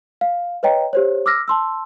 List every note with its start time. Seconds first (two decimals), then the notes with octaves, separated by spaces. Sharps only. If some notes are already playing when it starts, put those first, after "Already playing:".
0.21 F5
0.63 B4 C#5 D#5 G5 A#5
0.93 G4 C5 C#5
1.26 D6 E6 F6 A#6
1.48 A5 C6 E6